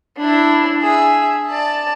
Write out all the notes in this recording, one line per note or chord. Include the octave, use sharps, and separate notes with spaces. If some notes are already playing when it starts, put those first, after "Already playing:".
D4 E4
G#4 E5
D5 A5